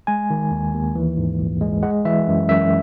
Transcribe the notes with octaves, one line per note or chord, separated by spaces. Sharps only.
G#3 G#5
D#3
D#2
D#2
E3
G#2
A#1
G#3
G#3 F#5
E3 E5
F#2
F#2 E5